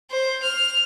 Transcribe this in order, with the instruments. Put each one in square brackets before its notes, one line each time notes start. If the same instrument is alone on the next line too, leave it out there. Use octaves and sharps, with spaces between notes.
[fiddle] C5
F6